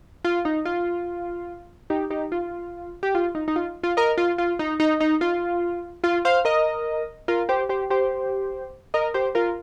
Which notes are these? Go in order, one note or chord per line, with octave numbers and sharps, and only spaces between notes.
F4
D#4
F4
D#4 G4
D#4 G4
F4
G4
F4
D#4
D#4
F4
F4
A#4 D#5
F4
F4
D#4
D#4
D#4
F4
F4
C5 F5
A#4 D#5
F4 A#4
G4 C5
G4 C5
G4 C5
A#4 D#5
G4 C5
F4 A#4